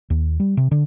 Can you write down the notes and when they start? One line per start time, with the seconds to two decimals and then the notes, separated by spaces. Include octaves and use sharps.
0.10 D#2
0.40 G3
0.57 C3
0.71 D3